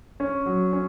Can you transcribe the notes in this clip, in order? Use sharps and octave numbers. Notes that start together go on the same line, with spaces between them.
C#4
F#3
C#4